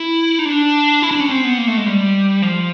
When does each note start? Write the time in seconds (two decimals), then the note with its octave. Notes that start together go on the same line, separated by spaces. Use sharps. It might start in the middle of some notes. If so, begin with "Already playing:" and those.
Already playing: E4
0.39 D#4
0.45 D4
1.02 E4
1.11 D4
1.20 C#4
1.29 C4
1.45 B3
1.58 A#3
1.67 A3
1.77 G#3
1.86 G3
2.42 F3